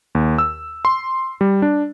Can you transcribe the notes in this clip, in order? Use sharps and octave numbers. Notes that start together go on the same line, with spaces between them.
D#2
E6
C6
G3
D4